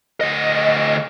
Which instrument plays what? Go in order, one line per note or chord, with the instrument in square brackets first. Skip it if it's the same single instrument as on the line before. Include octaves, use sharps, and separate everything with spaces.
[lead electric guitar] D2 D#5